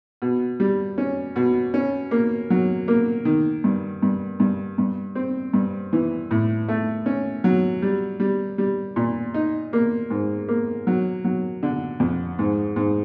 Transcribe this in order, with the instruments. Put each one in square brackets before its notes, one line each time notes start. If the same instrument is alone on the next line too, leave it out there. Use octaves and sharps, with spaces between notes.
[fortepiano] B2
G3
C#4
B2
C#4
A#3
F#3
A#3
D#3
G2
G2
G2
G2
C4
G2
E3
A2
A3
C#4
F#3
G3
G3
G3
A#2
D#4
A#3
G#2
A#3
F#3
F#3
D3
F2
G#2
G#2